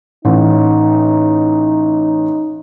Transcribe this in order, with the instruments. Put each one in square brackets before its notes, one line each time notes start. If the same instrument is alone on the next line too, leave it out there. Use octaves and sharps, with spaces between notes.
[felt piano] A1 [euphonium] D#4